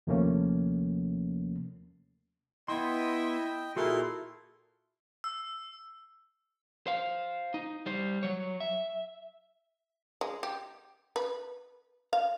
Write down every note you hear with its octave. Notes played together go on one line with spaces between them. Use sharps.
D#2 C3 F3 A3 A#3 C#4
B3 E4 D#5 G5 C6
A#2 E4 F#4 G#4 A4 C6
E6
C5 F5
D#4
G3 C5
F#3 C#5
E5
G#3
G4
B4
F5